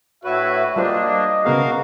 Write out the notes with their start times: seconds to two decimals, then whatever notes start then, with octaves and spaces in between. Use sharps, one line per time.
0.24 A2 D4 F#4 B4 C#5 E5
0.76 G3 A#3 D4 F4 C5 D#5
1.45 C#3 B3 F#4 G#4 A#4 F5